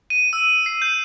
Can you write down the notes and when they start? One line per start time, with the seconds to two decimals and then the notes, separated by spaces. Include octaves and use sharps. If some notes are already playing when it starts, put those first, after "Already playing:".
0.10 D#7
0.33 E6
0.66 C7
0.82 G6